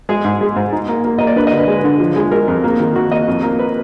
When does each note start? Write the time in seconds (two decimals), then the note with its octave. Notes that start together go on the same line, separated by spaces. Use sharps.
0.09 G#3 G#4
0.25 G#2
0.41 G#3
0.56 G#2
0.73 D#4
0.88 A#3
1.05 A#3
1.19 A#3 D#5
1.27 D5
1.36 D4 B4
1.47 D#5
1.52 D3
1.57 B4
1.68 G#3
1.84 D3
2.00 F3
2.16 G#3
2.32 G#3 A#4
2.48 F2
2.64 A#3
2.80 D#3
2.95 D#3 F#4
3.11 A#3 D#5
3.28 F2
3.43 A#3
3.59 B4